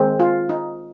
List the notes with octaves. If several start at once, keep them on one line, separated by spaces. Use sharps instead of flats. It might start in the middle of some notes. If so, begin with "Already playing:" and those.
Already playing: D#3 G#3 C4
F4
D#4